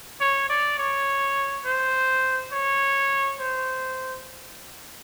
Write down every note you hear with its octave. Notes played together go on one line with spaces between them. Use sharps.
C#5
D5
C#5
C5
C#5
C5